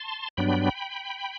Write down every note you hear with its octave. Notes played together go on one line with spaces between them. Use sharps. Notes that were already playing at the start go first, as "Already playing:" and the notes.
Already playing: A5 C6
G2 F#3 B3 D4 G5 B5